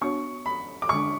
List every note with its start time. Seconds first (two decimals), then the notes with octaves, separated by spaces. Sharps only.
0.01 B3 D4 F#4 C#5 C#6
0.46 B5
0.82 D6
0.89 D3 G#3 D4 C#6